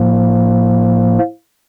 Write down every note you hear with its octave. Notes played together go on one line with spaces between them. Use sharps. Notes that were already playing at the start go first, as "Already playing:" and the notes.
Already playing: A2 F3 A#3